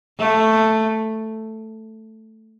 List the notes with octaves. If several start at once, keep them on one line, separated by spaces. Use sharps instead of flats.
A3